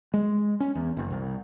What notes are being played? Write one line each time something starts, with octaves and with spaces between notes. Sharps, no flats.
G#3
C#4
E2
F#1
C2